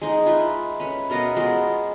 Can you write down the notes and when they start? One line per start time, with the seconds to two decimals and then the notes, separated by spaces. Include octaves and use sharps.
0.01 G#3 D#4
0.25 E4 F4 B4
0.80 C#4 B4
1.10 B2 A#4 D#5 F5
1.36 G#3 B3 F4 A#4